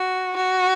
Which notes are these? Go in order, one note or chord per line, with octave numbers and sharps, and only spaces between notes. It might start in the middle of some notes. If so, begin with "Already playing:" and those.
Already playing: F#4
F#4